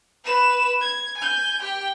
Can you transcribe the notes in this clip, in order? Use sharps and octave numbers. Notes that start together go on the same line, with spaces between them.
B4 E7
G#6
G#5 G6
G4 G5